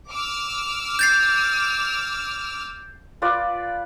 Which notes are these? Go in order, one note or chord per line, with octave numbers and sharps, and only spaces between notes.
D6 E6 F6
G6 A6 C7
F4 B4 D5